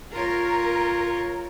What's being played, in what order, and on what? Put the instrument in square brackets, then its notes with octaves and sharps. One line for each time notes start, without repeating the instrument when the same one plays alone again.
[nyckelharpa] F4 C#5 [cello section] A#4